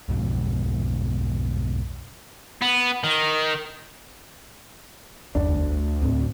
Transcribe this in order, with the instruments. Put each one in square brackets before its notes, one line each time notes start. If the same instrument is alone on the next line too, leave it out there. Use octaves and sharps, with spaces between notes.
[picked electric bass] B1 F2 G#2 B2
[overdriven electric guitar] B3
D#3
[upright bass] G1 E2 [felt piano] D4
[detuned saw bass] D2
[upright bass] A2 C4